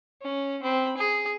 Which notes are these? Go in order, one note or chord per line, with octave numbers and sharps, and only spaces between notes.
C#4
C4 B5
G#4